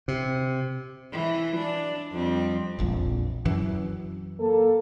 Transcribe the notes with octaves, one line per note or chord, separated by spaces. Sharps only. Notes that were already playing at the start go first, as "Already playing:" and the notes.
C3
E3
D4
F2 G3 C4
E1 A#1 F2
F#2 E3
A#3 A4